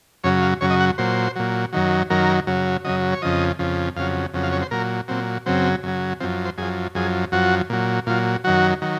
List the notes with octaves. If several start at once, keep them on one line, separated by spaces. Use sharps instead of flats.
F#2 C#3 F#3 C#5
F5
F#2 C#3 F#3 C#5
D#5
F#5
A#2 F#3 C5
A#2 F#3
F#2 D#3 F#3
F#2 D#3 F#3 A#4
F#2 C#3 F#3
F#2 C#3 F#3 D#5
C#5
F2 C#3 F3 D#5
F2 C#3 F3
F2 C#3 F#3 F5
F2 C#3 F#3
F5
C#5
C5
A#2 F#3 A#4
A#2 F#3 C4
F#2 C#3 F#3 C4
F#2 C#3 F#3
F#2 F3 C4
C5
F#2 F3 G#4
F#2 F3 G#4
F#2 F3 F#4
A#2 F#3
A#2 F#3 F4
F#2 D#3 F#3 F#4
D#3 F#3